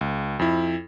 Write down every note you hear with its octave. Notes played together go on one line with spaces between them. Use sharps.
C#2
F2 E4